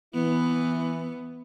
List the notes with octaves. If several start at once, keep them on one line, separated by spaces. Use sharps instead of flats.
E3 B3 E4